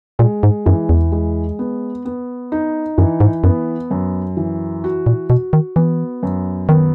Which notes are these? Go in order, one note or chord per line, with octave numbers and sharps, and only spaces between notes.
A#2 G#3
G#2
F#2 E3
E2
G#3
B3
B3
D#4
F#2 E3
G#2
F#2 B3
F#2
E3
F#4
A#2
B2 F#4
D#3
E3 B3
F#2
D#3 B3